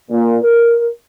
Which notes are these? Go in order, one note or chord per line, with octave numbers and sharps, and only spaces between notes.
A#2
A#4